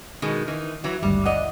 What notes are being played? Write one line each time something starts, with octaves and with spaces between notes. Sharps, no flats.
B2 D#3 G#3
D#3 E3
E3 F#3
G#1 D2 G2 G3
E3 D5 D#5 F#5